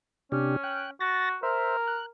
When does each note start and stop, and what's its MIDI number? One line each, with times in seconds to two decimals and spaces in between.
0.32 0.56 48
0.32 0.89 61
0.32 0.56 62
0.32 0.56 67
0.64 0.91 79
0.64 0.91 90
1.00 1.37 66
1.00 1.29 93
1.00 1.29 94
1.43 2.08 70
1.43 1.77 72
1.43 1.77 76
1.87 2.06 90